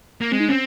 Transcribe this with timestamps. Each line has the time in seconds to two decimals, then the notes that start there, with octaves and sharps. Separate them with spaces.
0.21 A#3
0.31 G#3 C4
0.40 D#4
0.49 C4 C#4